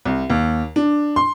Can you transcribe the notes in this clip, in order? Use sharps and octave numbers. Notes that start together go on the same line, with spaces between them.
C2
D#2
D4
C6